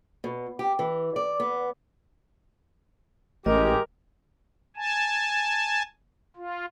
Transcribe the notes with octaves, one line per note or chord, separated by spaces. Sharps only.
B2
G4
E3
D5
B3
A1 G#3 G4 A#4 D#5
G#5 A5
F4